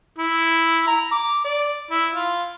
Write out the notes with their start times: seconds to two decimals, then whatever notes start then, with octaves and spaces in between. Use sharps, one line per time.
0.19 E4
0.87 A#5
1.12 D6
1.45 D5
1.91 E4
2.15 F4